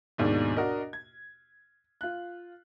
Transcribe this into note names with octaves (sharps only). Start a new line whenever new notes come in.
D#2 G#2 B2 A#3 D4
D4 F#4 A#4 D#5
G#6
F4 F#6